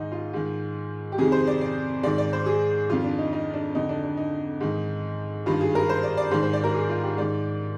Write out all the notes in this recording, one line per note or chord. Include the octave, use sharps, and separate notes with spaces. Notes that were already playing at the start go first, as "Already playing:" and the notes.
Already playing: G#2 D#3 D#4
F4
G#2 D#3
G4
F2 C3 D#3 G#4
C5
D5
D5
G#2 D#3 D5
D5
C5
G#4
F2 D#3 F4
D4
D#4
D#4
D4
F2 D3 D#4
D4
D4
D#4
G#2 D#3
G2 D#3 F4
G#4
A#4
C5
D5
D5
G#2 D#3 C5
C5
D5
A#4
G#4
F4
G4
G#2 D#3 D5